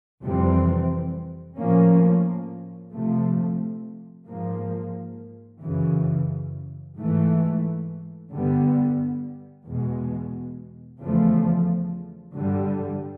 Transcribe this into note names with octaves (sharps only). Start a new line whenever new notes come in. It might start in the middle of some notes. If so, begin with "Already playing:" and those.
F2 C3 E3 G3 C4
A2 F3 A#3 C#4
C3 F3 A3
G#2 F3 A#3
F#2 C#3 E3
G#2 E3 A3
G2 D3 G3 B3
E2 B2 G#3
E2 C#3 F3 A3
G2 D3 G3